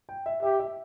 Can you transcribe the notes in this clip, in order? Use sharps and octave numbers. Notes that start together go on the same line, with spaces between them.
G5
E5
G4 E5
E5